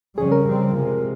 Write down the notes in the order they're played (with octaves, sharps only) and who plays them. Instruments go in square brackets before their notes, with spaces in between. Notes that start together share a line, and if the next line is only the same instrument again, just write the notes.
[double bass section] F2 C#3 G3 C#4 [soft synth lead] G#4
[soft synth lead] A#4
[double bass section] F2 C#3 G3 C4
C3 F3 G#3